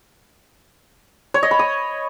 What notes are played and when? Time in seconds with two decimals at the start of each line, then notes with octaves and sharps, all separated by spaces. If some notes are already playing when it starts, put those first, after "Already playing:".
1.34 C#5
1.43 D#5
1.51 B5
1.59 D#6